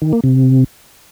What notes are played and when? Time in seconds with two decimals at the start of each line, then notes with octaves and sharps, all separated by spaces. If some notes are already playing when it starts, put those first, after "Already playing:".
0.02 D#3
0.13 A#3
0.24 C3